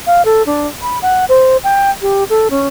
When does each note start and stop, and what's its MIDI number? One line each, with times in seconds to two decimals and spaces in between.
0.07 0.24 77
0.25 0.43 69
0.46 0.68 62
0.82 0.99 83
1.02 1.25 78
1.29 1.57 72
1.64 1.91 79
2.02 2.24 67
2.30 2.48 69
2.50 2.67 61